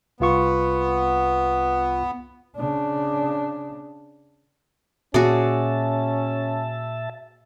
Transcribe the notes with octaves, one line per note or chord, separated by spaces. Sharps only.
C2 B3 F4 C#6
C#3 D4
A#2 C#4 F#4 G#4 D5 E5 A5